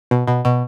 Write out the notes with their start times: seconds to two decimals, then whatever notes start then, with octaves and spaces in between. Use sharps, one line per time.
0.11 B2
0.28 B2
0.45 B2